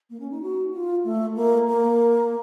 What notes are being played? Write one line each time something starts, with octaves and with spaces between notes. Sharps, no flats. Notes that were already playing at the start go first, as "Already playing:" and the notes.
A#3
C#4
D#4
F#4
F4
A3
A#3
A#3